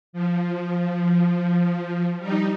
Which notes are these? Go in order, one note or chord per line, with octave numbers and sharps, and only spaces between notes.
F3
G3 D#4